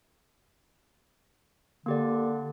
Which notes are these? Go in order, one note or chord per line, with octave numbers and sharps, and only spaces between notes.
D3 A#3 G4 D5